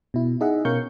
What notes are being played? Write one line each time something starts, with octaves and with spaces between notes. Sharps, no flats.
B2 E4
D#4 G#4 D#5 E5 F#5
B2 C#4 A#4 F5 C#6 G6